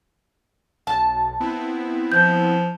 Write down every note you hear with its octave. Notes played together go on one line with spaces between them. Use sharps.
B1 A5
B3 C4 E4
F3 G6